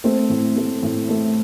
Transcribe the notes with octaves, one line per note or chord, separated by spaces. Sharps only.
A3 C4
A2
A3
A2
A3